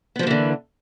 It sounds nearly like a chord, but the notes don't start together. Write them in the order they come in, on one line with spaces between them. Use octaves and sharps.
B3 F3 A#3 E3 D3